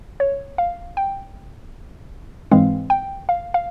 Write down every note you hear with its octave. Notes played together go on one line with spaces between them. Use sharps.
C#5
F5
G5
G#2 E3 G#3 C4 F5
G5
F5
F5